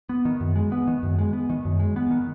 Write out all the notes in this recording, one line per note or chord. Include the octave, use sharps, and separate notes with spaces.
B3
D#3
F#2
G#3
B3
D#3
F#2
G#3
B3
D#3
F#2
G#3
B3
D#3